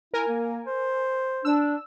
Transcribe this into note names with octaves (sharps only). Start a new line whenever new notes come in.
E4 A#4 G#5
A#3
C5
D4 E6